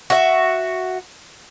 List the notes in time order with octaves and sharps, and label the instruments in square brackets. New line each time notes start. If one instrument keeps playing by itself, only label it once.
[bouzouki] F#4 E5